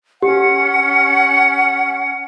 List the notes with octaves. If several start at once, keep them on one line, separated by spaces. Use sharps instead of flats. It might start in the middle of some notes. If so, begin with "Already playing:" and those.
C#4 G4 F#5